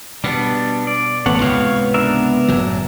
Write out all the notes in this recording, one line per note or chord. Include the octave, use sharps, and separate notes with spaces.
B2 G3 B3 D4
D5
A1 A3 B3 C#5 F#5
C#2 G#2 C3 C#5 F5
D4 A#4 E5
F#1 A2 F#3